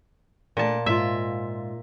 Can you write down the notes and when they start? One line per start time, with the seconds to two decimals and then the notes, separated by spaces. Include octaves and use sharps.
0.57 A#2 A3 D4 A5
0.86 G#2 F4 E5